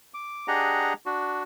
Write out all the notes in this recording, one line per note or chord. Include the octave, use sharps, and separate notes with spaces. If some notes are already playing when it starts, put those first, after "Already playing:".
D6
D4 G4 G#4 D#5 F#5 A#5
D4 F#4